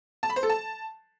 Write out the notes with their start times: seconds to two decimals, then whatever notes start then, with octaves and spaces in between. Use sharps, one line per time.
0.23 A5
0.30 B5
0.36 C5
0.43 A4
0.50 A5